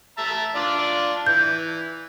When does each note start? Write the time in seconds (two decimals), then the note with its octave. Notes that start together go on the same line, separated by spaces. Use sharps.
0.18 E5 A5 A#5
0.56 D4 F4 D5
1.26 E3 G6